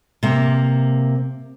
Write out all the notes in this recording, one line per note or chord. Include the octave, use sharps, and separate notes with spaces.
C3 A#3